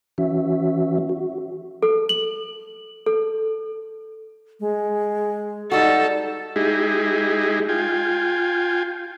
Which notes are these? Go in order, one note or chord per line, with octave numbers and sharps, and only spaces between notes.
E3 C#4 F#4 E5
F#4
A4
F#7
A4
G#3
G3 D#4 F#4 A4
G#3 D#4 E4 G4 G#4
F4 G5 G#5